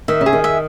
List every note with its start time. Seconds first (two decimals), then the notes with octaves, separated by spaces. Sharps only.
0.08 D#3 E5
0.21 C#3
0.26 G#4
0.33 D#3
0.44 E5